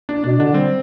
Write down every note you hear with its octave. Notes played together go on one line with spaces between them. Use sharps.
D4
B2 D4
D3 D4
G3 C4